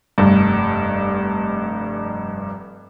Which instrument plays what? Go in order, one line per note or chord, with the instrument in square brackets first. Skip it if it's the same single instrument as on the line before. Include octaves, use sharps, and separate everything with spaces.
[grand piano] F1 G2